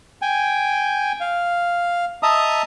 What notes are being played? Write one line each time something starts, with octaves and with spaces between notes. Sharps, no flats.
G5 G#5
F5
D#5 E5 A5 A#5 D#6